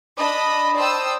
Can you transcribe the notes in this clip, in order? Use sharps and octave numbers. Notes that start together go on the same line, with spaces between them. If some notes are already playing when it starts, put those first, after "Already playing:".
D4 D#5 A5 B5
C5 D5 G5 A5 D#6 E6